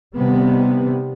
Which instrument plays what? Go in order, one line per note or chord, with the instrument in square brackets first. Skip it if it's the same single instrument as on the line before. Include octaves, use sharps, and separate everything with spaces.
[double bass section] C3 D#3 G3 B3